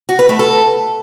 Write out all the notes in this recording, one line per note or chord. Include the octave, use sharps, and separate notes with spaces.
F#4
B4
A3
A4